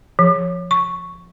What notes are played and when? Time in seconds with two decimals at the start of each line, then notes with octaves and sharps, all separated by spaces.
0.19 F3
0.71 C#6